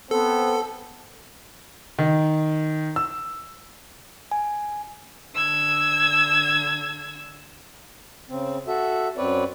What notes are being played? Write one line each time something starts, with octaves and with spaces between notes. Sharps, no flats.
B3 C4 A4 A5
D#3
E6
G#5
D3 E6 G#6
C#3 C4
F#4 A4 E5
F#2 C4 B4 C#5 D5